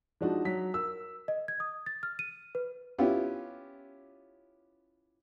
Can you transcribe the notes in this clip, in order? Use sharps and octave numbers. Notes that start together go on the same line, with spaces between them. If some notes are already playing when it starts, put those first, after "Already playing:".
F3 G#3 D4 D#4 F#4
F#3 B6
A#4 E6
D#5
G#6
D#6
A6
F6
D#7
B4
B3 C#4 E4 F4 G4